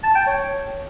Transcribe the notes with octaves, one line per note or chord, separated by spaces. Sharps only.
A5
G5
C#5